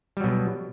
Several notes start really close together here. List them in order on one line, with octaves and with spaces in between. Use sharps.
G3 F#3 B2